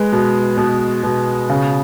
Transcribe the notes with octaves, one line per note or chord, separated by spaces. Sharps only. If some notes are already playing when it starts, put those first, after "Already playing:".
Already playing: G#3 B4
B2
B2
B2
C#3